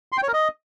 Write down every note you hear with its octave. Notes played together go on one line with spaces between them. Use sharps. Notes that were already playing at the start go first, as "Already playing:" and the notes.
C6
G5
C#5
A#4
D#5